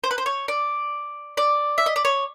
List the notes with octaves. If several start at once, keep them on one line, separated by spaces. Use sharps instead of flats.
C5
B4
C5
C#5
D5
D5
E5
D#5
D5
C#5